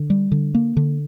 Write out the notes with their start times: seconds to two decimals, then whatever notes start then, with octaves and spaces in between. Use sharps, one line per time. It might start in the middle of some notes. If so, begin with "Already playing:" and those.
Already playing: D3
0.10 G3
0.32 D3
0.55 A#3
0.77 D3